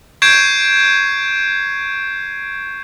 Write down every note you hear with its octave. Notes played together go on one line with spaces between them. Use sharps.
C#6 G6 G#6 C7 D7 E7